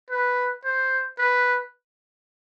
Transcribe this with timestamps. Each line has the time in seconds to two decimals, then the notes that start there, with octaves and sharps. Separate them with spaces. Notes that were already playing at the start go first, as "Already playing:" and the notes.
0.11 B4
0.64 C5
1.18 B4